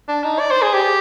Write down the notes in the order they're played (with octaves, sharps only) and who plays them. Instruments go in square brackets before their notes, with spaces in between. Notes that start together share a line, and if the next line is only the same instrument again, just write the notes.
[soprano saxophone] D4
D#4
D5
C5
G#4
G4